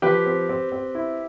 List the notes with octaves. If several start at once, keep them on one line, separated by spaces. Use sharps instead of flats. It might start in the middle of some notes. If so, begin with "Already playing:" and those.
F3 G4 B4
C4
C4
C4
E4